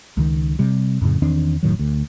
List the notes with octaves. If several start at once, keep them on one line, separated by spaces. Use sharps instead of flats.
C#2 D#3
C3 G3
F2 A2 C#3
E2 D#3 C4 D4
F1 A2 D#3 F#3
D2